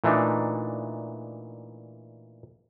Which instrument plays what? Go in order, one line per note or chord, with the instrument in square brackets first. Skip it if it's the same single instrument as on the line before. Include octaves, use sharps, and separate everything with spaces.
[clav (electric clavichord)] A#2 E3 A3 D4 D#4